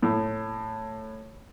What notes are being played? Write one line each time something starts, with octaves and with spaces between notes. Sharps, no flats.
A2